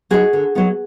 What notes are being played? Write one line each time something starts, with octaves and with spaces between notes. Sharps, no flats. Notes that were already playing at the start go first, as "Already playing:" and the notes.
F#3 B3 D#4 F#4 G#4
D3
F#3 B3 D#4